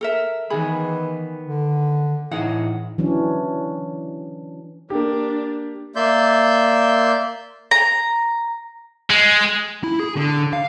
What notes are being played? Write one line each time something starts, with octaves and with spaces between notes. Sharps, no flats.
A4 A#4 E5
D#3 E3 B3 G#4 B5
D3
A2 E3 D#4 G#4 F#5
E3 F#3 C#4 D4
A#3 D4 G4
A#3 D5 E5 C6 G6
A#5
G#3
E4
G#4
D3
F5